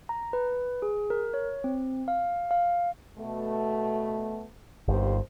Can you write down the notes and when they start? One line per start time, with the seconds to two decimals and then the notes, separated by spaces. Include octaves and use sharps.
0.09 A#5
0.33 B4
0.82 G#4
1.10 A#4
1.34 C#5
1.64 C4
2.08 F5
2.51 F5
3.18 B2 A3
4.88 G1 D#2 C5